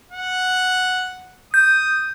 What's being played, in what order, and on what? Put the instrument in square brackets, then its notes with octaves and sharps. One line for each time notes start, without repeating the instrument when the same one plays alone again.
[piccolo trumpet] F#5
[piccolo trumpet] D#6 [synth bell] G6